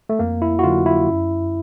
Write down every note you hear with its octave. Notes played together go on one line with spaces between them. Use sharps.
A3
F2 A#3
E4
F#4
D3 F#3 F4
E4
F#2